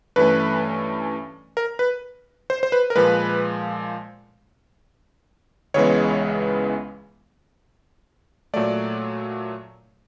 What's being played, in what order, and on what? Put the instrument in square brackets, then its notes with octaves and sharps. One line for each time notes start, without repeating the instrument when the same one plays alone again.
[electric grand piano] G2 E3 A3 C#4 B4
A#4
B4
C5
C5
B4
A#4
A#2 F3 G#3 B4
C#2 C#3 E3 G#3 B3 C#5
A#2 F#3 A3 D5